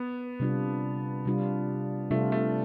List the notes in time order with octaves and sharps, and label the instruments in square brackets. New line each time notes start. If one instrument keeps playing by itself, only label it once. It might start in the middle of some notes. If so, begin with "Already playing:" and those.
Already playing: [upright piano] B3
[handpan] C3 G3 D4 F4
C3 G3 D4 F4
[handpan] C3 G3 D4 F4 [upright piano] A3
[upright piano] A3